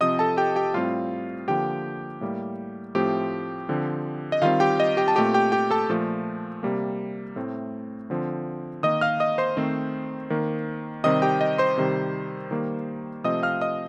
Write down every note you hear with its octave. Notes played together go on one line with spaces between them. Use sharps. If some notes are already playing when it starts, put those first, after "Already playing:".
C3 F3 C4 D#5 D#6
A4 A5
G4 G5
G4 G5
A2 G3 C4 F4 F5
D3 F3 A#3 G4 G5
A2 G3 A#3
A2 F3 A3 C4 G4 G5
D3 F3 C4
D#5
D#3 G3 C4 F4 F5
G4 G5
D#5
G4 G5
A5
A#2 A3 C4 G4 G5
G4 G5
G4 G5
A4 A5
A#2 F3 A3
C3 G3 A#3
A2 A3 C4
D3 F3 C4
D#3 A#3 D#5 D#6
F5 F6
D#5 D#6
C5 C6
D#3 A3 C4
D#3 A#3
C3 D#3 G3 C4 D#5 D#6
G4 G5
D#5
C5 C6
C3 D#3 G3
D#3 G3 A#3
C3 F3 A3 C4 D#5 D#6
F5 F6
D#5 D#6